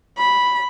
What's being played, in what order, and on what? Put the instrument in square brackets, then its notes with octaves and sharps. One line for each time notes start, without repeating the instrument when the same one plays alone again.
[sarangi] B5